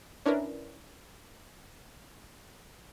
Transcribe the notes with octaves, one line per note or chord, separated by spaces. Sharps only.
C#4 D4 E4 A#4 B4